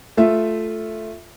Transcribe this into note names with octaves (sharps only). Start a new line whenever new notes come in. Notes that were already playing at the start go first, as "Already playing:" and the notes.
A3 F4 E5